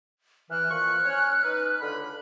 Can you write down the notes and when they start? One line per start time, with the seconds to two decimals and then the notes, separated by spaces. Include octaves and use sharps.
0.50 E3 F6 F#6
0.71 A#2 F3 C#6
1.04 C#4 C#5
1.44 D#4 B4
1.81 C#2 D3 B5